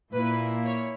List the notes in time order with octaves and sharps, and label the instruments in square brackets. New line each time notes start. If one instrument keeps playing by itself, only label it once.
[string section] A#2 A#3 E4 B4
C#5